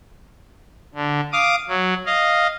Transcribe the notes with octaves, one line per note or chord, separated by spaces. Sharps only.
D3
F5 D6 D#6
F#3
D#5 F5